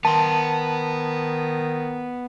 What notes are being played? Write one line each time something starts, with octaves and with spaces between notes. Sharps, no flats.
D#3 B3 A5 C6